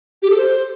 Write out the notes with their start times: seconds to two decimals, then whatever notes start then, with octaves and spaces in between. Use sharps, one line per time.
0.22 G4
0.30 A4
0.37 C5